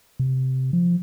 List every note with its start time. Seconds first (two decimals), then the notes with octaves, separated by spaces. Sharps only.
0.20 C3
0.73 F3